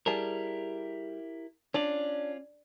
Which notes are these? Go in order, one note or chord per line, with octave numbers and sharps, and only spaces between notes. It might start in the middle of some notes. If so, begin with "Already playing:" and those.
G3 E4 G4 G#4 A#4 A5
C#4 D4 F4 D5